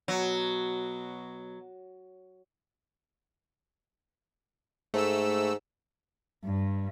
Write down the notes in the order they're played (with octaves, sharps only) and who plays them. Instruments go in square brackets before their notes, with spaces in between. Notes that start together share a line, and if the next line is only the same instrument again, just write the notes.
[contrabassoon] B2 [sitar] F#3
[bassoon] G#2 [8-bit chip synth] A3 E6
[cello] G2